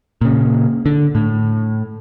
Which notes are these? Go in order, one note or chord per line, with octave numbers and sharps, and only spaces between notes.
A#2 C#3
D3
A2